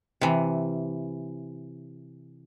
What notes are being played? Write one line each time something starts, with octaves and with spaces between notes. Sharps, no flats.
C3 E3